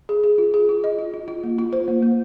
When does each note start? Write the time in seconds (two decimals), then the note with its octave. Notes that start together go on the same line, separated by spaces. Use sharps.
0.09 G#4
0.24 G#4
0.38 F4
0.54 G#4
0.69 F4
0.84 D#5
0.99 F4
1.14 F4
1.28 F4
1.44 A#3
1.58 F4
1.73 C5
1.88 A#3
2.03 A#3